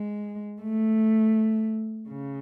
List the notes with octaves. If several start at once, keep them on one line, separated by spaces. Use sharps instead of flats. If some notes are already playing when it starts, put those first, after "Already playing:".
Already playing: G#3
A3
C#3